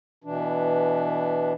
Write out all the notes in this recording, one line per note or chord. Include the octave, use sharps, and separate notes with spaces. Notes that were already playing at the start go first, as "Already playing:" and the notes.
B2 E3 D4